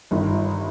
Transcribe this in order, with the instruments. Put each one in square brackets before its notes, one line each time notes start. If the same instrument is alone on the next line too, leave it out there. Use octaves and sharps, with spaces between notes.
[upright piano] G1 G2 D#3